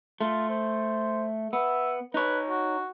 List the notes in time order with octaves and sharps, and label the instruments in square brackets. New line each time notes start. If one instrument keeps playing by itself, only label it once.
[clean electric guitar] A3 [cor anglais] F4
[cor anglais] C5
[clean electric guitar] B3 [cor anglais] E5
[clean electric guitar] D#4 C#5 [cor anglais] B4
[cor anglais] F#4